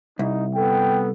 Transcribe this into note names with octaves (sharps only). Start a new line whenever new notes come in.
C2 D#4
B3 A4 G5